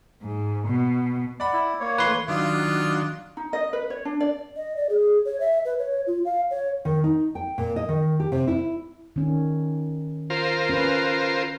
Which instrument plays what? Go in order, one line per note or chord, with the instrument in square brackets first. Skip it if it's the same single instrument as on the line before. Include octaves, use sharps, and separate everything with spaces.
[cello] G#2
B2
[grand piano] D5 F#5 B5
[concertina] E4
A#3 C#5
[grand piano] E3 A3 [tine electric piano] B4 C6
[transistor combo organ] D#3 F#3 D4 [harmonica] F4
[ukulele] D#4
D#5
B4
C#5
D4
D5
[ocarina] D#5
D5
G#4
C#5
E5
B4
C#5
F4
F5
C#5
[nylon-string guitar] D#3
D#4
G5
A#2
D#5
D#3
G4
C3
E4
[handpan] D#3 C#4
[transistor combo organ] F4 A#4 C5
[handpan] C#4 B4